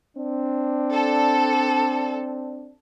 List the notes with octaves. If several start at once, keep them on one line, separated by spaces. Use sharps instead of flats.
C4 D4
A4